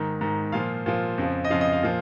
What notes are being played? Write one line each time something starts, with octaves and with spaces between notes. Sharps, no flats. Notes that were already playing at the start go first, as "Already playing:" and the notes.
Already playing: G#2 D#3
G#2 D#3
A#2 F3 F5
A#2 F3
F2 C#3 F3
D#5
F2 C#3 F3 F5
D#5
F5
A#2 F3